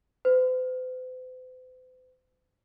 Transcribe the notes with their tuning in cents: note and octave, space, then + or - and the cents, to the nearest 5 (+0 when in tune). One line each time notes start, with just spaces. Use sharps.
C5 -45